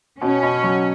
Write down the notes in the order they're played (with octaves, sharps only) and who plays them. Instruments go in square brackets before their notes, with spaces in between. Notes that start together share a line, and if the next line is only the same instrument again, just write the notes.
[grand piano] B2 [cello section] C#4
[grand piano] B2
F#3